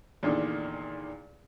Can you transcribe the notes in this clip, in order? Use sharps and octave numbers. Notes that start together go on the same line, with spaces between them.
E2 A#2 D3 D#3